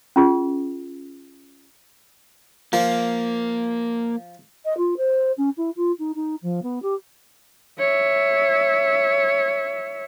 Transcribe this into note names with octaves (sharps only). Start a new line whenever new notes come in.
C#4 F4 G#4
F3 A#3
D#5
F4
C5
C#4
E4
F4
D#4
D#4
F3
B3
G4
C#5 E5